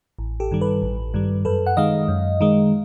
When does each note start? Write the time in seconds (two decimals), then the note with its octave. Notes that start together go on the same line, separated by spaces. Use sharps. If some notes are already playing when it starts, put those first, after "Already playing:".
0.19 A1
0.40 G4 A4
0.51 G2 D#3 G3
0.61 A4 B4
0.82 A1
1.14 G2 D#3 G3
1.45 F#2 A4 B4
1.66 F#5
1.77 D#3 G#3 D#5 F5
2.08 F#2
2.41 D#3 G#3